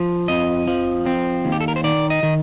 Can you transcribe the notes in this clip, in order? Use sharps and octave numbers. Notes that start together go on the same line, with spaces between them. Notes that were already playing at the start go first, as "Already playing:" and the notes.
Already playing: F3
F2 D#5
F3
C4
D#2
G4
A4
A#4
C5
D#3 D5
D#5
D#3